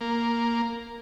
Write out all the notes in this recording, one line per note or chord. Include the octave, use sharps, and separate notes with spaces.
A#3